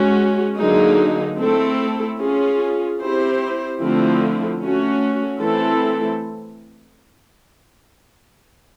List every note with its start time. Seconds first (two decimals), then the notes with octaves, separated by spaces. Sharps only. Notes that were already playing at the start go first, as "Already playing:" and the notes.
Already playing: G#3 C#4 F#4
0.57 D3 F#3 A#3 D#4 G#4
1.38 A3 C4 E4 A4
2.19 C#4 F4 G#4
2.99 C4 E4 G4 C5
3.80 D3 F3 A3 C4 E4
4.61 A3 C#4 F#4
5.41 E3 A3 C4 E4 A4